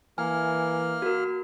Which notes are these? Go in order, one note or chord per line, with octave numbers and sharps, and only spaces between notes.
E3 A#3 G#5 F6
F#4 A#4